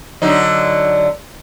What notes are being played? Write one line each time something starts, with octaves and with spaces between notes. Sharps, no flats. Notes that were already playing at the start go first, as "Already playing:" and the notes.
D3 F#3 D#4